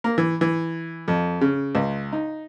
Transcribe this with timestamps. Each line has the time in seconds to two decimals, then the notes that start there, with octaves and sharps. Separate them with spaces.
0.04 A#3
0.18 E3
0.41 E3
1.08 F2
1.41 C#3
1.75 C#2
2.12 D#4